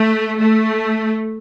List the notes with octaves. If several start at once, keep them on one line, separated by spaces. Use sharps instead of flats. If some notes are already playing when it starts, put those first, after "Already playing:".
Already playing: A3
A3